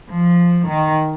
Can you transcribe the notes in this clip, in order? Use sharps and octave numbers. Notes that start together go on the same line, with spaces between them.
F3
D#3